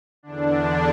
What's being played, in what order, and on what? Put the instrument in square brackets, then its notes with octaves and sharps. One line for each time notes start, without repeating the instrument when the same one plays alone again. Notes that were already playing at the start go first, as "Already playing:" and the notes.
[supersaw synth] E2 D3 D4